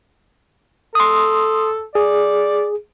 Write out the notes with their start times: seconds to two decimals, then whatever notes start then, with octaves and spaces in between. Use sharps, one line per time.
0.95 A4 C6 D#6
1.95 G#4 D5